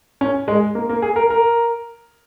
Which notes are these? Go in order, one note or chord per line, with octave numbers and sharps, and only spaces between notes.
C#4
G#3
A#3
A#3
G#4
A#4
A#4